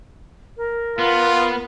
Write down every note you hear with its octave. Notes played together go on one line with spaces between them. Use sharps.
A#4
B3 F4